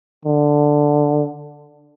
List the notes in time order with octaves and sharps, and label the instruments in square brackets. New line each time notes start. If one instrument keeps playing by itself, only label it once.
[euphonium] D3